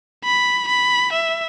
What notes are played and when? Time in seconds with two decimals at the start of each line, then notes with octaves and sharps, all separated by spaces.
0.25 B5
0.68 B5
1.12 E5